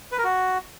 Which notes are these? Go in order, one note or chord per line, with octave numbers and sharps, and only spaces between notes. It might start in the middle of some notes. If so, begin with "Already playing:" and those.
B4
A#4
F#4